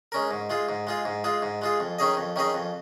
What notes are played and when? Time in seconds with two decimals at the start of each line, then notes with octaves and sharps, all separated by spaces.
0.12 G#3 C#4 A#4
0.31 G#2
0.50 G#3 F4 G#4
0.69 G#2
0.87 G#3 F4 G#4
1.05 G#2
1.24 G#3 F4 G#4
1.42 G#2
1.62 G#3 F4 G#4
1.80 F2
1.99 D#3 C#4 G#4 D#5
2.17 F2
2.36 D#3 C#4 G#4 D#5
2.54 F2